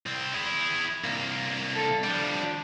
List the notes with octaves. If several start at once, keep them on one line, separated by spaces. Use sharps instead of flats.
C2 C4
E4 G#4
C2 A#3
A4
F3 G3 D4